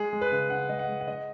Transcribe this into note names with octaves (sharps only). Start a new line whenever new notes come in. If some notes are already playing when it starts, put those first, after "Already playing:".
Already playing: G#3 G#4
G#3
B4
C#3
C#3 F#5
G#3 D#5
F#5
G#3
F#5
G#3 D#5